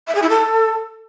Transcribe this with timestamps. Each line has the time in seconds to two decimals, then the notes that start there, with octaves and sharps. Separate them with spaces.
0.07 E5
0.14 G#4
0.22 E4
0.29 A4